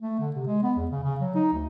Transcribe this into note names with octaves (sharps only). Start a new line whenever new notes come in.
A3
D3
C3
G#3
B3
E2
C#3
C#3
F#3
D#4
D2